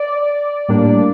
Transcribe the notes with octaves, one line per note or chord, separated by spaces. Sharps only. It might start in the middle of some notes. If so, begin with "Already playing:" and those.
Already playing: D5
A2 G3 A#3 D4